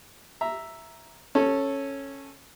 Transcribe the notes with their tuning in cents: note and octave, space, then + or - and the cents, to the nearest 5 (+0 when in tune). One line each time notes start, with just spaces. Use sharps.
E5 +0 A#5 +0
C#4 -10 A4 +0